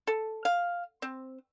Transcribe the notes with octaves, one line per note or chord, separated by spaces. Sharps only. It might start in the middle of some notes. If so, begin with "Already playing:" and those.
A4
F5
C4